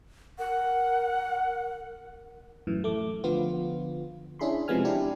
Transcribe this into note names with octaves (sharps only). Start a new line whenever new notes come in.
A#4 F#5
F#2 A2 E3
A3 D6
D3 F3 B3 F4
C#4 D4 E4 G#4 B5 C6
C3 F3 G#3 B3 G#5 F6
D4 E4 G4